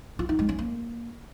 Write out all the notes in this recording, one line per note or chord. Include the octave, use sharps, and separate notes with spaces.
F4
D#4
G#3
C#4
A#3